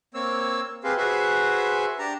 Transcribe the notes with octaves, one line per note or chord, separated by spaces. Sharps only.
A#3 C4 C#5 E6
C4 G4 G#4 B4 C5 F5
F#4 G#4 B4 C5 E5
D4 G4 A5 A#5